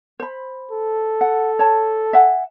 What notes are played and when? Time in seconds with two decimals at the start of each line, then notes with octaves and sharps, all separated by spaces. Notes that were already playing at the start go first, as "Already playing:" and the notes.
0.20 C5 B5
0.71 A4
1.21 F#5
1.59 C#5 A5
2.13 E5 F#5 G#5